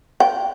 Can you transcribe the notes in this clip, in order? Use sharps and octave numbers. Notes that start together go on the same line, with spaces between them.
G5